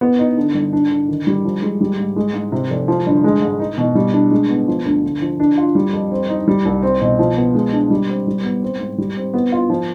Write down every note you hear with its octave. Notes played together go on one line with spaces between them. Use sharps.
B3
D#4
D3
G1
D4
D3
D#3
G3
F3
G#3
G3
G#2
G#3
G#2
C3
F1
F3
G1
G#3
G#2
D#4
B2
G3
D4
G#3
B3
F3
D2
D3
F3
D4
F4
G3
F2
C4
D#4
G3
C2
C4
B2
F3
B3
G#3
D4
G3
C4
G3
B3
C4
G#2
G3
C4
B3
F4
F3